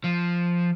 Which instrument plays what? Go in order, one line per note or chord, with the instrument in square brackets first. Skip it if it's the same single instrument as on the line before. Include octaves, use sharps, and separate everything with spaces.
[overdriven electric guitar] F3